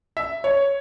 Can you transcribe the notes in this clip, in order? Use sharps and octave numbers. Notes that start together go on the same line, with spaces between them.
E5
C#5